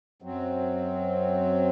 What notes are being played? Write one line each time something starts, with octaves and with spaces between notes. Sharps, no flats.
F#2 F#3 C4